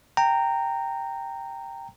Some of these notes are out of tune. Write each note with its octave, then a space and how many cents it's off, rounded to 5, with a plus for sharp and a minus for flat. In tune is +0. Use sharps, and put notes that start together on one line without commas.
G5 +0 A#5 -15